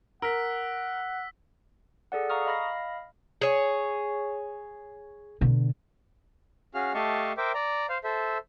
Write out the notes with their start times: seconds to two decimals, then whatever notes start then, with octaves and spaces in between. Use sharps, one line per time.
0.22 A#4 F#5 E6 B6
2.12 G#4 A4 D5 F#5
2.29 F5 A#5 C#6 D#6 F6
2.46 D#5 F5 B5 F6 A#6
3.41 G#4 C#5
5.41 B2 D3
6.74 C#4 F#4 G#4 F5 F6
6.94 A3 G4 D#5 F5 A5 C#6
7.37 A#4 C5 E5 G5 D6
7.54 D5 A#5
7.89 C5 F5
8.04 A4 C5 E5